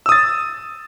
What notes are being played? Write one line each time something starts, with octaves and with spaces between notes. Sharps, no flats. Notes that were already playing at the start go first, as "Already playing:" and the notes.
D#6 E6 A6